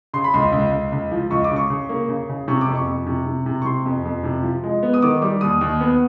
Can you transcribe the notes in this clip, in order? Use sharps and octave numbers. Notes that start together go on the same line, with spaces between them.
C#3 C6
B5
C#2 C6
C#2
C#2
C#2
F3
C#2 C#6
D6
C#3
C#6
C#3
A#3
C#3
C#3
C3 C#6
D6
F2
C#6
F2
C3
C3
C3
C#6
C3 C6
F2
F2
C3
F3
G#3
B3
D#6
D#3 D6
G3 D6
D#2 D#6
D#2
B3